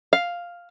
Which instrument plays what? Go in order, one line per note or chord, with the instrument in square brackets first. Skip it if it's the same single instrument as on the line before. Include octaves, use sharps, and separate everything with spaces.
[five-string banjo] F5